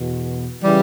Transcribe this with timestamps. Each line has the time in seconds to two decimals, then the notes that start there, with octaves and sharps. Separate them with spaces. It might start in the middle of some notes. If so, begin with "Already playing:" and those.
Already playing: E2 B2
0.63 C#3 E3 G3